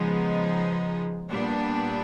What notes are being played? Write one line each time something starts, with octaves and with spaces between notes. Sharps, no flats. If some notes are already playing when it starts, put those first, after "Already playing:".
Already playing: C#3 F3 G#3 B3 D#4
A#2 G3 B3 D4